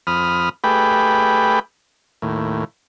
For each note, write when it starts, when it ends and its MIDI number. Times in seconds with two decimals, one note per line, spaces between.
0.07 0.49 41
0.07 0.49 83
0.07 0.49 87
0.07 0.49 89
0.64 1.59 57
0.64 1.59 67
0.64 1.59 68
0.64 1.59 71
0.64 1.59 79
0.64 1.59 83
2.22 2.64 39
2.22 2.64 45